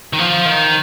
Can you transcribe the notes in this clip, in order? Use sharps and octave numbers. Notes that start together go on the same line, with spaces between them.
D#3
F3
D#3